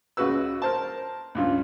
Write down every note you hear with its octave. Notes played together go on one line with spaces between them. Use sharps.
C#2 C#3 F#4 B4 E6
A#4 C5 A5
C#2 G2 F4